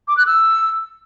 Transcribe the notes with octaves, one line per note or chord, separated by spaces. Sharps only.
D6
F#6
E6